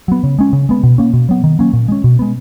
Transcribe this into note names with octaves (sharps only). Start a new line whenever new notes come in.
F#3 B3
C#3
G#3 C#4
C#3
G#3 B3
B2
A#3 C#4
B2
F#3 B3
D#3
F#3 A#3 C#4
A#2
G#3 C#4
B2
G#3 B3